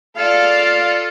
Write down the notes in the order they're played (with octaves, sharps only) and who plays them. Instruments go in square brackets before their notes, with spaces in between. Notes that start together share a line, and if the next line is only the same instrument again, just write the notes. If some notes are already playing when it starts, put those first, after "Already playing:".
[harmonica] F4 A4 [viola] D5 F5